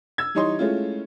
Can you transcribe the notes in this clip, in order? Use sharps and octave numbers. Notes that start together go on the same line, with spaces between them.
E6 G#6
E3 G3 D#4 C#5 D#5 C6
G#3 A3 C#4 E4 F4